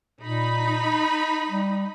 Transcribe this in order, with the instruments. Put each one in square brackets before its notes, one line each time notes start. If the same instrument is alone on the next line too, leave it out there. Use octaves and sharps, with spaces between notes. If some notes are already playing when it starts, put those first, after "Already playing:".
[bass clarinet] A#2 [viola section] D#4 B5
[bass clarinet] G3